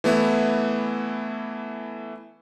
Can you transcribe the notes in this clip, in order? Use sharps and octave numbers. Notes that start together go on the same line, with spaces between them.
E3 A3 B3 E4